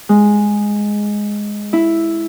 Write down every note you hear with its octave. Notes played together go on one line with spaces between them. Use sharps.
G#3
E4